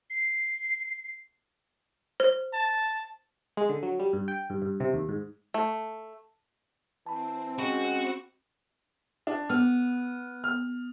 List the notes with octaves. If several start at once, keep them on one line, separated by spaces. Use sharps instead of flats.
C7
C5
A5
G#3
D3
F#3
G3
G2
G5
G2
G2
C3
D#2
G#2
A3
E3 C4 A5 B5
G#3 C#4 F#4 G5 B5
D4
B3 F6
F6